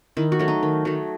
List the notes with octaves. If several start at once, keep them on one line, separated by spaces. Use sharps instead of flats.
D#3 E4
F#4
F#3 A3
D#4
D#3
F#3 A3